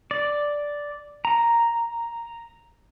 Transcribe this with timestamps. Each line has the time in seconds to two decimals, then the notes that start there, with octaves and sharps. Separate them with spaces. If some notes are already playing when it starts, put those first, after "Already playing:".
0.11 D5
1.25 A#5